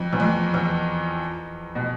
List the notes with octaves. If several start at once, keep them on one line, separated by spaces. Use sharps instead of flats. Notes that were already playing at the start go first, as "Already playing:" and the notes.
Already playing: F2
E2
F2
E2
B2